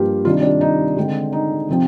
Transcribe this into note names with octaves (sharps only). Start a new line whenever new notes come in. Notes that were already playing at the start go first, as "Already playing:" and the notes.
Already playing: G2 F3 A#3 F4 G4
C3 D#3 G3 D4 F4
D4
D#4
D3 G#3 C4
D#4
C3 F3 C4